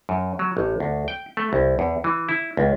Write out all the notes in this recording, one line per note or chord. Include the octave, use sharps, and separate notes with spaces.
F#2
F#3
A1
D2
G5
A3
C2
E2
E3
E4
C#2